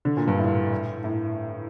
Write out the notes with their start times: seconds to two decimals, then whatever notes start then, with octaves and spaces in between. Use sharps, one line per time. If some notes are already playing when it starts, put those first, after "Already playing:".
0.05 D3
0.17 A#2
0.28 G2
0.39 A2
1.04 A2